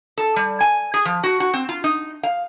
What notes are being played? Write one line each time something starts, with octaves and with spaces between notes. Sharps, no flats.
A4
G3
G#5
G#4
F3
F#4
F#4
C4
F4
D#4
F5